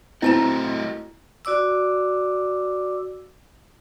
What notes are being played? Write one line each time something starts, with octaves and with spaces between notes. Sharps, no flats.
A3 C4 E4 F#4 D#5 A5 A#5
F#4 D5 D6 E6